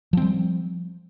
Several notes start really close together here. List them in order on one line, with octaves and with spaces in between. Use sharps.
F3 C4 G3